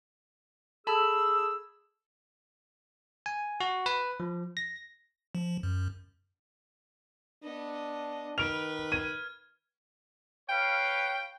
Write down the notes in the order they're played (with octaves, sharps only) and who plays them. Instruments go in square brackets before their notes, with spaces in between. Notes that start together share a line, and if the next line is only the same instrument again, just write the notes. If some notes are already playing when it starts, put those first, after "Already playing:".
[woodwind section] G#4 E6 [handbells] A4 A5 B5
[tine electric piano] G#5
F#4
B4
F3
A#6
[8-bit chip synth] F3
F#2
[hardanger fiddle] B3 D#5 [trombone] D4
[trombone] D#3 [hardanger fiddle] B4 [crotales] F6 [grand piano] D7 F7
[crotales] G#6 [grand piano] D#7
[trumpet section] B4 C#5 F5 [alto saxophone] G5